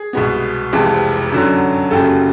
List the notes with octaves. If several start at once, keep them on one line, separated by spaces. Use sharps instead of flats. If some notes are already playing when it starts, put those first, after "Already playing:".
Already playing: G#4
C2 B2 G#3 B3
F1 F2 C3 E3 G#3
F#2 D3 F#3
F#1 F#2 C#3 G4 A4